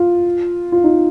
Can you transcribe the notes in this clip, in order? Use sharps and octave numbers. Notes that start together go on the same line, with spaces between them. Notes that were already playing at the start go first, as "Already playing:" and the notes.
Already playing: F4
F4
D#4